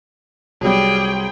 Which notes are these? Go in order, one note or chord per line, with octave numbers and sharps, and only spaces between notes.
C2 F#3 G3 G#4 G5